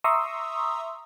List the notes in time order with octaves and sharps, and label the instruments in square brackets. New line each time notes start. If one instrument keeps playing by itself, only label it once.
[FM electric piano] E5 A#5 C6 C#6 D#6 E6